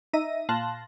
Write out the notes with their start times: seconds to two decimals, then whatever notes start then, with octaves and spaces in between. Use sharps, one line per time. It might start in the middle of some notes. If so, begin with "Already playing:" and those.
0.13 D#4 E5 A#6 D#7
0.49 A#2 F5 A5 C6 F#6 A#6